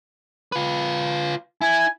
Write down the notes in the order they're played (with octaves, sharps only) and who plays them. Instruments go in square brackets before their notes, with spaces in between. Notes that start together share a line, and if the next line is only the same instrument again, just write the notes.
[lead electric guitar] F4 B4
[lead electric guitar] E4 [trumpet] G#5